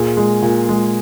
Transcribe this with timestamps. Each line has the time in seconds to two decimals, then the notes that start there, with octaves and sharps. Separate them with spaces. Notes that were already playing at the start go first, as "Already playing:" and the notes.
Already playing: A#2 G#4
0.17 G#3
0.42 A#2
0.69 G#3